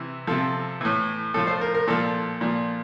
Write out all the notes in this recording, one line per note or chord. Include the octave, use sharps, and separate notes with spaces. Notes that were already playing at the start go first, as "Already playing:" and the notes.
Already playing: C3 E3
C3 F3 A4
A2 E3
A2 F3 A4
C5
A#4
A#4
A#2 F3 A4
A#2 F3